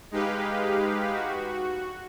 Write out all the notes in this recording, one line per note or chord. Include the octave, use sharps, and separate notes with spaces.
G#3 D#4 G4 B4 F5
F#4